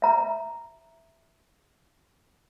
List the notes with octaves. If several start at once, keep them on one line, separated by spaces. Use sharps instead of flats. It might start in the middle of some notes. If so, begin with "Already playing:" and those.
E5 A#5